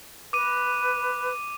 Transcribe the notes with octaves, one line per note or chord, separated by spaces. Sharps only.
B4 D6 D#7